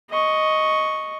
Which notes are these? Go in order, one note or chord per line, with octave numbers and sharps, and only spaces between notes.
D#5 C#6